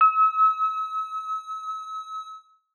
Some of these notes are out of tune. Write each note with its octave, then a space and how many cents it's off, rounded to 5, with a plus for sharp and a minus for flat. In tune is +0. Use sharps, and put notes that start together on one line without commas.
E6 -40